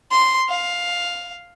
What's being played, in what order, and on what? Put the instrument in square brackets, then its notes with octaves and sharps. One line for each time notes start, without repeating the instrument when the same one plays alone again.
[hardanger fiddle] C6
F5